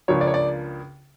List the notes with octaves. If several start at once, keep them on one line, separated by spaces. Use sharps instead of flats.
C#2 C#3 F3 A#3 D4 C#5
D5
C#5
D5